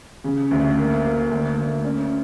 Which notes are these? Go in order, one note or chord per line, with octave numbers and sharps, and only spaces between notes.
C#3
D2
A#3
A#3
D2
D2
C#4